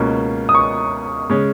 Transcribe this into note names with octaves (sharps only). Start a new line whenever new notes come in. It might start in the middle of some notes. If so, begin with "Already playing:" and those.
Already playing: C#2 B2 A#3 C#4
D#6
C#6
C#3 G#3 C#4